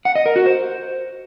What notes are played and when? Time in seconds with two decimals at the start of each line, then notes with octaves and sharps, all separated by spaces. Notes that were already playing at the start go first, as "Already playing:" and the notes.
0.05 F#5
0.15 D#5
0.26 A#4
0.36 F#4
0.46 C5